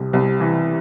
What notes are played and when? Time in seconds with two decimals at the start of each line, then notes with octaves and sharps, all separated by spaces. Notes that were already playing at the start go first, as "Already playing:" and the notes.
Already playing: C2 C3
0.13 C2
0.40 E3